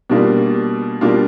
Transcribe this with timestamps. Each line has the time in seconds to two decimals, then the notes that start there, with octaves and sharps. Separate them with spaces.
0.10 B2 G3 A#3 D4 F4
1.01 B2 G3 A#3 D4 F4